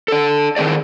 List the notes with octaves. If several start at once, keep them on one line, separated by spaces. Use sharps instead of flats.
D4 A4
D#3 C4 G#4 D5